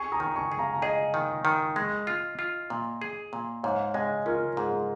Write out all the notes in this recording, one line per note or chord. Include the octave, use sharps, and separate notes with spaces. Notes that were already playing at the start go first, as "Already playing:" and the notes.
Already playing: G#4 G#5 C#6
A#5 D#6
D#3
G#5 C#6
G#4
F5 A#5
A#5
G#4 D#5 G#5
D#3
D#3
G#3
F4
F4
A#2
G#4
A#2
G#2 C#5 F5
G#3 D#5 G#5
C#4 F4 A#4
G#2 G#4